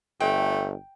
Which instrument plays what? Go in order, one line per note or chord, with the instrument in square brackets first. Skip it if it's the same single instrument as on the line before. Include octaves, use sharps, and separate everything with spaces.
[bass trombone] G1 [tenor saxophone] A3 [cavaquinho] G5